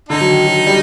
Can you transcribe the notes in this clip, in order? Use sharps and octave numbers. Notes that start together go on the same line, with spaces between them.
D3 D#4
F#3
D#3
F#3
G3